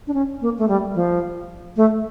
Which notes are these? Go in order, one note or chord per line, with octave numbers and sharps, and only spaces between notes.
D4
C#4
A#3
A3
G3
F3
A3